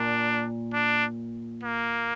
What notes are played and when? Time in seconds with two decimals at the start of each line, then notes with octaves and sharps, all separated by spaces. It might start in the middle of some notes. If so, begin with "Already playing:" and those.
Already playing: A#2 D4
0.73 D4
1.63 A#3